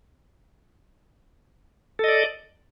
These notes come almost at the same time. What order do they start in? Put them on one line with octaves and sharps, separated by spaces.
A4 D#5 D5